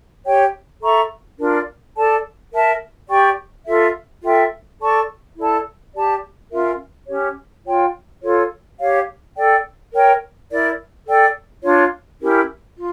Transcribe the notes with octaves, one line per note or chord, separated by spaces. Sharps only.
G4 C#5 G5
A4 E5 A#5 C#6
D4 F4 A#4 D5
A4 D5 A5
A#4 E5 A5
G4 D5 G5 C#6
F4 A4 E5
F4 A4 E5 G5
A4 D5 A5 C#6
E4 A4 D5 A5
G4 D5 A5
C#4 F4 A#4 E5
C#4 G4 C#5
F4 C#5 G5
F4 A4 C#5
G4 C#5 F5
A4 D5 G5
A#4 C#5 G5
E4 A#4 D5
A4 D5 G5
D4 F4 C#5
C#4 E4 G4 A#4
F4